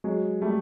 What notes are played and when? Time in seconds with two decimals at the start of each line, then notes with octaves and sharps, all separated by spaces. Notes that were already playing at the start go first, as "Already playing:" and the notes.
0.04 F#3 G#3
0.41 G3 A3